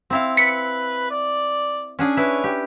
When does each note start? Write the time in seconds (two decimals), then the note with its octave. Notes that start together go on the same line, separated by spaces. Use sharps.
0.10 C4 E4 F5
0.37 B4 B6 C#7
1.11 D5
1.99 C#4 D4 G#4
2.17 E4 B4 C#5
2.44 G4